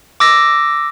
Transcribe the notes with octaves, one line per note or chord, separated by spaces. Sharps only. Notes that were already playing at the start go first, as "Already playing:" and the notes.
D6 E6 A#6